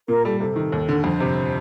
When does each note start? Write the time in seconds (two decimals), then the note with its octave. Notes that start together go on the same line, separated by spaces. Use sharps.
0.08 A#2 A#4
0.25 G3 A4
0.40 C3 A4
0.56 D#3
0.72 D#2
0.89 D3
1.04 F2 C5
1.20 C3